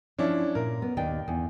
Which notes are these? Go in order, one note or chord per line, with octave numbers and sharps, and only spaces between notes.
F3 C#4 D4 E4
A#2 A#4
B3
D#2 D5 G5
E2